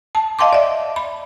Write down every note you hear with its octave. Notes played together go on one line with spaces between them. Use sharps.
A5
D#5 F5 G5 A5 C6 D6
D5 E5
B5